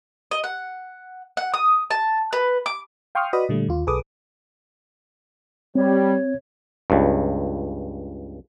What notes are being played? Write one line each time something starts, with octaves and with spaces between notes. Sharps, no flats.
D#5
F#5
F#5
D#6
A5
B4
D6
F5 G5 C6 C#6 D#6 F6
F#4 B4 D5 D#5 B5 D#6
A#2 D3 G3 A3
D#2 F4
B1 G#4 A4 B4 D6 D#6
G3 C4 C#5
C#2 G2